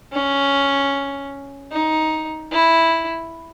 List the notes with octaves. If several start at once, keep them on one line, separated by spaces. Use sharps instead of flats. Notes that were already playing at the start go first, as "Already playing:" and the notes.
C#4
D#4
E4